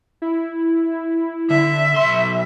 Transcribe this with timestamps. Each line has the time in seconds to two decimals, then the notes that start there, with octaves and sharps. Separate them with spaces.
0.22 E4
1.50 D3 E5
1.96 B1 C6